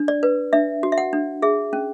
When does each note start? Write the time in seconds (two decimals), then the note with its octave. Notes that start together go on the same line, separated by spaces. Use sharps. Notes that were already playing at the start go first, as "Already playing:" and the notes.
Already playing: D4
0.08 D5
0.23 B4
0.53 D4 E5
0.83 F#4
0.92 E5
0.98 F#5
1.13 D4
1.42 G#4 E5
1.73 C#4